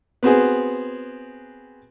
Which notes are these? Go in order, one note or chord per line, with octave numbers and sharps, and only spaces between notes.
B3 C4 F#4 G#4